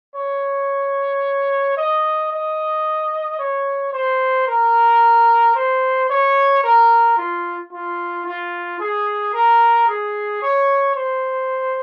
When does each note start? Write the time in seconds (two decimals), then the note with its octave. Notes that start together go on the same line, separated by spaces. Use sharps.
0.15 C#5
1.77 D#5
2.32 D#5
3.39 C#5
3.93 C5
4.47 A#4
5.55 C5
6.10 C#5
6.64 A#4
7.17 F4
7.72 F4
8.26 F4
8.80 G#4
9.34 A#4
9.88 G#4
10.42 C#5
10.95 C5